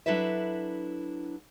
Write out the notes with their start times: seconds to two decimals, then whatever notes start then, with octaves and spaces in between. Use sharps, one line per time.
0.06 F#3 D4 E4 A4 B4 E5